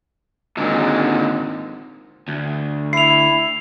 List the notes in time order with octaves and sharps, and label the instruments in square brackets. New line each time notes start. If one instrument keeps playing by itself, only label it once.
[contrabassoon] G#1 [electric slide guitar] A#2 D3 G#3
[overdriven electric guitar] D2
[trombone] E4 [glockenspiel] C7 F7